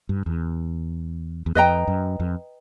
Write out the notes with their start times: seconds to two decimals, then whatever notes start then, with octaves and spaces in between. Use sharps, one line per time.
0.09 G2
0.26 E2
1.46 E2
1.55 F2 B4 D#5 G5 A#5
1.88 F#2
2.20 F2